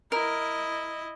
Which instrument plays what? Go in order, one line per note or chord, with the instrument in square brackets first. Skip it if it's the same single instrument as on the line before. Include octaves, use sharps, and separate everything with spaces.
[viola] E4 D#5 [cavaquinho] A#4